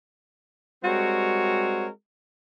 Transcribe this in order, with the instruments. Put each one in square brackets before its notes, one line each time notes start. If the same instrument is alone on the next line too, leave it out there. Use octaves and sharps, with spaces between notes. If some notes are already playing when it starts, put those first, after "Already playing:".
[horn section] G3 G#3 C4 F#4 A#4 C#5